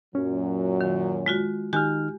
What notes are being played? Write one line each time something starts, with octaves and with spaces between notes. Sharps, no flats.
F#2 A#2 F#3 C#4
D#3
G#3 F4 F#4
D#3 D#4 G4 G#5 F6 F#6